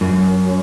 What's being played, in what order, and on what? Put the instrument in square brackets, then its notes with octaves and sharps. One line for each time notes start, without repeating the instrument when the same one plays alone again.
[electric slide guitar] F#2